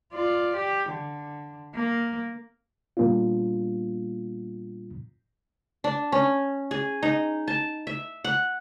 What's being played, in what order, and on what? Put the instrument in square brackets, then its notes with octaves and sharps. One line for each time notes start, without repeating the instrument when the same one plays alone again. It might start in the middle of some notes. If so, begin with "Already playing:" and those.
[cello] F4 D5
G4
D3
A#3
[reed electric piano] A#2 G3 A#3 B3 D4 F4
[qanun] D4
C#4
G#4
D#4
A5
E5
F#5